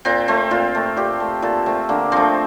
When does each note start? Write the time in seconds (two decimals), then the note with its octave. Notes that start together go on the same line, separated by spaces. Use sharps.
0.05 A#2 C4
0.28 A3 C4
0.51 A#2 F4
0.75 A3
0.96 A#2 G4
1.20 A3
1.42 A#2 A4
1.66 A3 C4
1.89 D3 A#3
2.12 F3 A3 C4